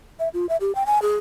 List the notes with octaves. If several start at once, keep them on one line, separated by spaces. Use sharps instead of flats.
E5
F4
E5
G4
G5
G#5
G#4